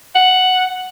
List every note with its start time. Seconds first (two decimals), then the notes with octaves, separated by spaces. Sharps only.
0.15 F#5